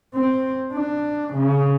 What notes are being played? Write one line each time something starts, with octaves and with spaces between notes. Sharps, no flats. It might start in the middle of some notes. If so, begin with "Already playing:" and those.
C4
D4
C#3